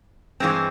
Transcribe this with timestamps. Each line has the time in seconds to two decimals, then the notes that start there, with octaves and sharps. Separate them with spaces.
0.40 G2 E3 G#3 C4